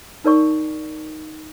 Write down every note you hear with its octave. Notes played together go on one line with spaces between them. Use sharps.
D#4 A#4 D5 C#6